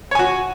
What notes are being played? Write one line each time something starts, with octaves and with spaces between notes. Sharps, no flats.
F#4 C#5 G#5